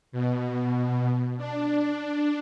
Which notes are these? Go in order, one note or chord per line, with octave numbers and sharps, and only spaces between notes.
B2
D4